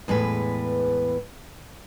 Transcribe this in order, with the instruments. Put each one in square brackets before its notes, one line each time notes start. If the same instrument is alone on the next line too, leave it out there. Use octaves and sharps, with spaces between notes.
[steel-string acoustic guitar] E2 A2 G#3 B4